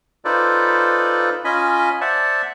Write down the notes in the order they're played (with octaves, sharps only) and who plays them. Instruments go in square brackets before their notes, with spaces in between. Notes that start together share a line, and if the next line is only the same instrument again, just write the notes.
[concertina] D#4 F4 A4 B4 C5 D5
C#4 F4 D#5 G#5 B5
C5 D5 E5 F#5 A5